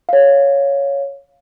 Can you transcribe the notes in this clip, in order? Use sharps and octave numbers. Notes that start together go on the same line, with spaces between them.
C#5 F5